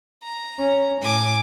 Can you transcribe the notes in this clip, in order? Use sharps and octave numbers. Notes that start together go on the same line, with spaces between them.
A#5
C#4
A2 G#5 D6